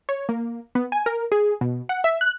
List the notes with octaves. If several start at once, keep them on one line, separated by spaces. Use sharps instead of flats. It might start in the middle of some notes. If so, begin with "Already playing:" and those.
C#5
A#3
B3
G#5
A#4
G#4
B2
F#5
E5
F#6